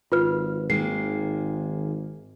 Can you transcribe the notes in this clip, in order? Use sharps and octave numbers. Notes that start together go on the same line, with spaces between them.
G#1 F4 B4 F6
D#3 G#3 A#3 C7